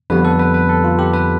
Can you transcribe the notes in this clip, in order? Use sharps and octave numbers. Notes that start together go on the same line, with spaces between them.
F2 D3 G3 B3 B4
A4
B4
B4
A4
F4
G4
B4